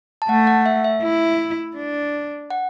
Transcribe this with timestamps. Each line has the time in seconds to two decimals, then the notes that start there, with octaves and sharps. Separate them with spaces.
0.22 A5
0.29 A3 F#5
0.47 F#5
0.66 E5
0.84 E5
1.02 E4
1.76 D4
2.50 F#5